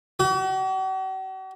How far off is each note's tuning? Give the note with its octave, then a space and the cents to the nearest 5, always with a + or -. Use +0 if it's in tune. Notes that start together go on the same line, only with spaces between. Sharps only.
F#4 +45